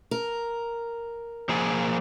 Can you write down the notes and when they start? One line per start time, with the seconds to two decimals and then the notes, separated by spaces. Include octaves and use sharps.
0.11 A#4
1.49 F3 A#3 G#4